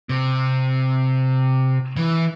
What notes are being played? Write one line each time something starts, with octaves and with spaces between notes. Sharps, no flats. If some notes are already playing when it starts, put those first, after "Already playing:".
C3
E3